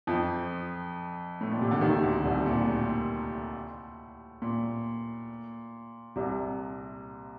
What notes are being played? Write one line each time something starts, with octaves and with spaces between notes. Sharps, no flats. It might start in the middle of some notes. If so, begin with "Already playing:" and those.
F2 F3
A2
A#2
C3
D3
D#2 D#3
C3
D2 D3
C2 C3
A#2
A2
A#2
C2 C3